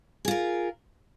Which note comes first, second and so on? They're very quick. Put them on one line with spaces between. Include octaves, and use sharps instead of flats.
G#4 F4 A#4